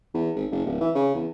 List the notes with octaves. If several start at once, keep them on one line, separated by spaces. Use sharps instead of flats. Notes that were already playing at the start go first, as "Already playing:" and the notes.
E2
G#1
F#1
D1
E3
C#3
E2